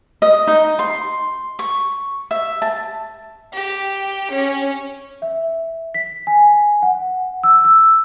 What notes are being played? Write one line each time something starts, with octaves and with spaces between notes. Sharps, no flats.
D#5
D#4
C6
C#6
E5
A5
G4
C#4
E5
B6
G#5
F#5
E6
E6